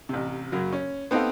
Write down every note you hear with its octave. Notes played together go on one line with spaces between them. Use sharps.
A1 C3
F#2 C#3 F#3
C#4
B3 C4 D#4 G4 A4 F5